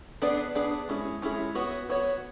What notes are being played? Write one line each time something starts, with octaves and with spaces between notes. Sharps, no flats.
B3 D4 G#4 D5
B3 D4 G#4 D5
G#3 C#4 E4 G#4
G#3 C#4 E4 G#4
B3 F#4 C#5
B3 F#4 C#5